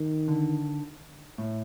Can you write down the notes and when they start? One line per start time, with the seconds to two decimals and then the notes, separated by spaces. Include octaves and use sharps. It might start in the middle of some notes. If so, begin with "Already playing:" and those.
Already playing: D#3
0.28 D3
1.38 A2